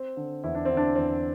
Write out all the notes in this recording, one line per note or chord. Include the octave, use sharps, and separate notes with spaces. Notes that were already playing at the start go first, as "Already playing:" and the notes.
Already playing: C4
D3
E2 E4
D4
D3 C4
D4
E2 C4